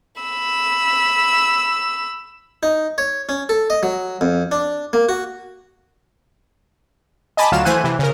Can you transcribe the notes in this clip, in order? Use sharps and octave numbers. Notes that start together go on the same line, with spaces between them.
B5 E6
D#4
C#5
C#4
A4
D#5
F#3
F2
D4
A#3
F#4
D#5 G#5 A5 B5 D6
D2 F#3 F4 F5 E7
E3 A3 C5 G#5 F#6 D#7
C3 E3
C#3 A#4